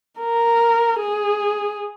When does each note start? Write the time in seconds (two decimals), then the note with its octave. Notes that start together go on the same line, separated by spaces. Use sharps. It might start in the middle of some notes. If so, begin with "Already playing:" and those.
0.20 A#4
1.00 G#4